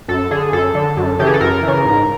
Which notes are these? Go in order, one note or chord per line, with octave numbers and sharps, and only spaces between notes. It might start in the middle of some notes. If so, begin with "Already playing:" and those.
F#2 A4
D3 G#4
F#2 A4
D3
F#2
C#3 E3 G4
G#4
A4
F#2 A#4
C#3 E3
G#2